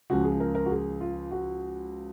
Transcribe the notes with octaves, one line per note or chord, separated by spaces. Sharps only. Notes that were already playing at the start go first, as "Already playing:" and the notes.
C#2 C#3 F3 F#4
G#4
A#4
A#4
F#4
G#4
F4
F#4